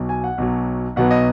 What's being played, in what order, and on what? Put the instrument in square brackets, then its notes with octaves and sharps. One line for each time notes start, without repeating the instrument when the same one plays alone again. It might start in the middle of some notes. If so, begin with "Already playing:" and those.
Already playing: [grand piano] B1 B2 F#3
G#5
F#5
B1 B2 F#3
B1 B2 F#3 B3 F#5
D#5